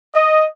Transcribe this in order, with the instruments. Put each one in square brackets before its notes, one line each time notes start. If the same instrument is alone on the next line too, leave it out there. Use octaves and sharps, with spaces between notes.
[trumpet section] D#5